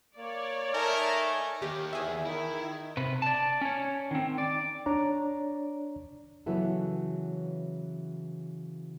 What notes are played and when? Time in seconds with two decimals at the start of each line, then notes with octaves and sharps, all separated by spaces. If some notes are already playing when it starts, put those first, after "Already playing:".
0.17 A#3 C#5 D5
0.74 A3 D#4 A#4 G#5 A5
1.62 D#2 D#3 G4
1.93 E2 G#4 E5
2.25 D#3 E4
2.97 C3 B4
3.22 D5 A5
3.61 C#4 C#5
4.11 D#3 C4
4.38 D5
4.86 D4 C#5 D5 A#5
6.46 C#3 E3 F#3 B3 E4 A4